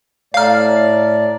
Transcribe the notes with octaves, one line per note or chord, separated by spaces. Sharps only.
A2 A3 C#5 D5 F5 A#5 F6